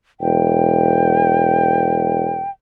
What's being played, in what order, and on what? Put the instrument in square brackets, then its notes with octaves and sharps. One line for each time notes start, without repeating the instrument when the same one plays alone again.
[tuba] E1 [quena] G5